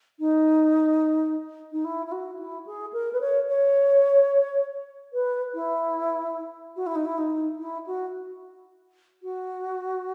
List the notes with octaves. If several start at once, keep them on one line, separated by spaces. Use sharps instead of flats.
D#4
D#4
E4
E4
F#4
E4
G#4
A#4
B4
C#5
C#5
B4
E4
F#4
E4
D#4
E4
D#4
E4
F#4
F#4